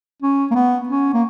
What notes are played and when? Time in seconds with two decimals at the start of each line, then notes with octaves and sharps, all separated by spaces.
0.22 C#4
0.51 A#3
0.55 B3
0.89 C#4
1.14 A#3